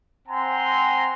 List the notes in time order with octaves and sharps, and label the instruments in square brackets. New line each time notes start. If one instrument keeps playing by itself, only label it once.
[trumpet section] C4 F#5 G#5 A#5 C6